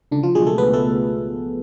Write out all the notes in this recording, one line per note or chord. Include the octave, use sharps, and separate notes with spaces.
C#2 D3 D4
F3 F4
B2 F#3 G#3 G#4
A3 A4
C#2 B3 B4
A3 A4